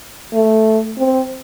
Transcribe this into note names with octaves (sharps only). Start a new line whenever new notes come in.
A3
C4